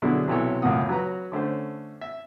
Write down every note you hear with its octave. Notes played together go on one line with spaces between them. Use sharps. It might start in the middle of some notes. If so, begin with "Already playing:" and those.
B2 D3 F#3 D4 E4 G#4
B1 C3 E3 F#3 A4 C#5
C#2 F#2 A2 F#5 D#6
F#3 B4 A#5
D3 A3 C#4 C5
E5